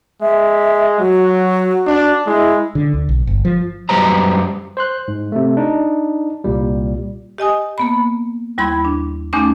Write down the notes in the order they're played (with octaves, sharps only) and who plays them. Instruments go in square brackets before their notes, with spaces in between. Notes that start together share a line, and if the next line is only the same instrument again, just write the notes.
[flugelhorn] G#3 [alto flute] E5
[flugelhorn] F#3 [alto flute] F#4
[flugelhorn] D4
[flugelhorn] G#3 [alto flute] E4
[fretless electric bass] D3
D2
B1
G1
F3
[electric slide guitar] F#2 G3 B4 C5 A#5
[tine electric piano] C5 C6 F#6
G#2
C3 A3
D4 D#4
C2 A#2 G3
[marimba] G4 D#5 G#5 D#6
A#3 B3 B5
D#2 G3 E4 B5 C6 G#6
D4
E2 A3 C#4 D#4 D6